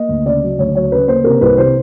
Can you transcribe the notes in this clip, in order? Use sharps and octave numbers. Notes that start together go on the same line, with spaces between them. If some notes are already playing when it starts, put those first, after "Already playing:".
Already playing: A#3 D#5
D2
C#3 D5
F#3
D2 C#5
F#3 C#5
C#3 B4
A#3 C5
C3 A#4
C2 B4
C3 C5